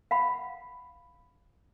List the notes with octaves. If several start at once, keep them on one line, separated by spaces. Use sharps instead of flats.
F5 F#5 B5